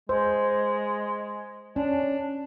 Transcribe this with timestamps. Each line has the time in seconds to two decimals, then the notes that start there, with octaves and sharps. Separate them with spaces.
0.09 G#3 C5
1.76 C#4 D4